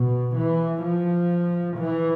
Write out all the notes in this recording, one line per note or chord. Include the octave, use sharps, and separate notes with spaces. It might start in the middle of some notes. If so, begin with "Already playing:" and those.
Already playing: B2
E3
F3
E3